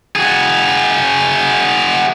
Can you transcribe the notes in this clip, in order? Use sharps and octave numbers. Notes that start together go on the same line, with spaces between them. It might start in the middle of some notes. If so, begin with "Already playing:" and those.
F#4 G#4